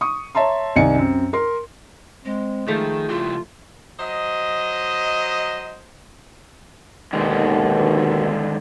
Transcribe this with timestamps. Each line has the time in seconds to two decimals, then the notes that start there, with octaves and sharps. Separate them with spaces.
0.01 C#6 D#6
0.35 C#5 E5 A5 A#5 C6
0.76 C2 D#3 D5 G#5 C#7
0.95 F#2 C4
1.33 A#4 C6
2.25 G#3 C4
2.68 D#3 F3 A3 G#4
3.09 C#3 E4 F4 G4
3.99 F#3 C5 D#5
7.13 D#2 B2 D3 D#3 G#3